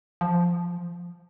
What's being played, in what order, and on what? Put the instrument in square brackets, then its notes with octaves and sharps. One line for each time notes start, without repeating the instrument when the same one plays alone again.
[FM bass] F3